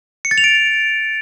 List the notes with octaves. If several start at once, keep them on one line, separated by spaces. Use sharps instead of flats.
C#7
A6
F7
D7